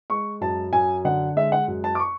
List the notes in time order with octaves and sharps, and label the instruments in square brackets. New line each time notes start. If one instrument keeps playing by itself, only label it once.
[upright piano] G#3 C#6
F#2 A5
F#2 G#5
D3 F#5
G#3 E5
F#5
F#2
A5
D6
C#6